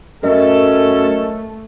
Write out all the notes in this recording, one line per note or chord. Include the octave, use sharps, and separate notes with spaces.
F#2 A3 C#4 A4 A#4 D#5 E5